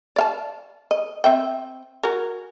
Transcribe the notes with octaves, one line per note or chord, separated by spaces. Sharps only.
D5 F5 A5
D#5
C4 E5 G5
F#4 G#4 A#4